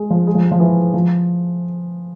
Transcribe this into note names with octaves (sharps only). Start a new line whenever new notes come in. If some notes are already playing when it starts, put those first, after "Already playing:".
Already playing: G#3
F3
G#3
F3
G#3
F3
E3
F3